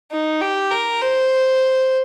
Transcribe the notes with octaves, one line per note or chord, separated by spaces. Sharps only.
D#4
G4
A#4
C5